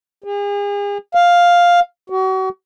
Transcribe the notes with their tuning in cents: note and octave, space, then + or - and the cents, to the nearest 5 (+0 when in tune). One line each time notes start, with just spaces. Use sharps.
G#4 -40
F5 +5
F#4 +35